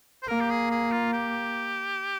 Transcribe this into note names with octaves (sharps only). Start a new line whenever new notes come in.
C5
A#3 A#4
G4
G#4
G#4
F4
G4